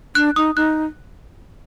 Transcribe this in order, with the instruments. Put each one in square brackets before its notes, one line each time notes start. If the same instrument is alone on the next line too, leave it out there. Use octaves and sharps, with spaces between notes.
[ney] D4 [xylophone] F#6
[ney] D#4 [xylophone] D#6
[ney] D#4 [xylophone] F#6